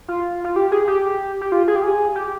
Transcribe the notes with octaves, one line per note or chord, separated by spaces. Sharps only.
F4
F4
G4
G#4
G4
G4
F4
G#4
G4
G#4
G4